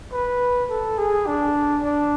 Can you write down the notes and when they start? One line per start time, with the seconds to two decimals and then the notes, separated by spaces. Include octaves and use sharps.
0.12 B4
0.69 A4
0.98 G#4
1.27 D4
1.83 D4